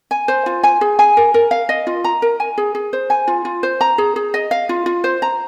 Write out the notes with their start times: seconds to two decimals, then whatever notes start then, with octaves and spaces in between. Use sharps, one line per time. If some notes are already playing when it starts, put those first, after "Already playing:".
0.11 G#5
0.28 C5
0.46 F4
0.63 G#5
0.81 G#4
0.99 G#5
1.17 A#4
1.34 A#4
1.51 F5
1.69 D#5
1.87 F4
2.04 A#5
2.22 A#4
2.40 G#5
2.58 G#4
2.75 G#4
2.93 C5
3.10 G#5
3.28 F4
3.45 F4
3.63 C5
3.81 A#5
3.98 G#4
4.16 G#4
4.34 D#5
4.51 F5
4.69 F4
4.86 F4
5.04 C5
5.22 A#5